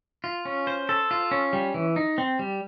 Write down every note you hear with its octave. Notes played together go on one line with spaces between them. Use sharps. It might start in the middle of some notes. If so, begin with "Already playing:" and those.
F4
C#4
C5
A4
F4
C#4
G3
E3
D#4
C4
G3